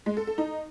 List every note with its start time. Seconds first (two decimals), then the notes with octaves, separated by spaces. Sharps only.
0.06 G#3
0.17 A4
0.27 A4
0.38 D#4